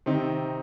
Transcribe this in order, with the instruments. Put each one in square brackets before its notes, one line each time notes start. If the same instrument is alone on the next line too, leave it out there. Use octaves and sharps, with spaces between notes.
[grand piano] C3 D#3 C4 D#4